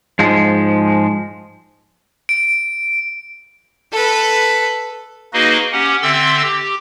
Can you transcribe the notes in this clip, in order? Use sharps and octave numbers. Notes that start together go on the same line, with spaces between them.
G#2 F3 G#3
D7
A4 B4
A#3 D#4 F#4 G#4 B4 D#5
C#4 G4 F#5
D3 C4 E5 C6 E6 A6
G4